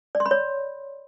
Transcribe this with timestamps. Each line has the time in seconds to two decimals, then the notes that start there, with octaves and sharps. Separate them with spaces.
0.15 D5
0.20 C6
0.26 B5
0.31 C#5